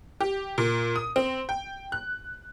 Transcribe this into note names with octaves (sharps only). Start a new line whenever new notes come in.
G4
A#2
D#6
C4
G5
F#6